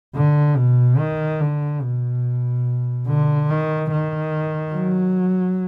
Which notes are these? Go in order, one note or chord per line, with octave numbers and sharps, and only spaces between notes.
D3
B2
D#3
D3
B2
D3
D#3
D#3
F#3